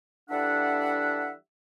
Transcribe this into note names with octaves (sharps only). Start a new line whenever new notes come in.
E3 G3 D4 A4 E5 F#5